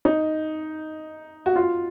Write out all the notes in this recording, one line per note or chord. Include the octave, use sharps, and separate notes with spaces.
D#4
F#4
F4